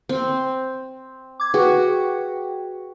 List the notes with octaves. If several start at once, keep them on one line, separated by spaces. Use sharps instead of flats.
C4
D6 G#6
F#4 G#4 B4 G5